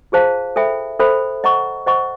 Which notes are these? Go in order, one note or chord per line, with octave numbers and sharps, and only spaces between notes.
F4 G#4 C5 F5 A5
A4 C5 E5 G5 B5
A4 C5 E5 G5 B5
C5 D#5 F#5 A#5 C#6
C5 D#5 F#5 A#5 C#6